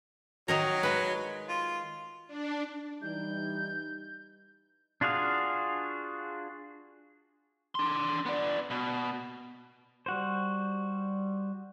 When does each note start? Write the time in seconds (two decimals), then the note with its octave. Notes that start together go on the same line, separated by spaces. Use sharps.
0.48 D#3 F#3 D#4 A#4
0.83 G#3 B4
1.49 F4
2.27 D4
3.02 E3 G3 D#4 G6
5.01 D4 F4 F#4 G#4 F5
7.75 D4 C6
8.26 B3 D5
8.70 B2
10.06 G3 F#4 C5